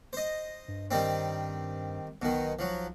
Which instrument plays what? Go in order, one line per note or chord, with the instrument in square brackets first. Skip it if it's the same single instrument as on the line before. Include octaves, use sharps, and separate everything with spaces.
[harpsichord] C5 D#5
[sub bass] G2
[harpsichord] D#3 G3 C4
[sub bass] B1 [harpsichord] B2 D#3
[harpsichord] F3 F#3